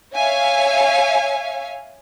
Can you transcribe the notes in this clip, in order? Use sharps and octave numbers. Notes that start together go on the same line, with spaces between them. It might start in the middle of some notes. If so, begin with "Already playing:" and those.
C#5 E5 F5 G#5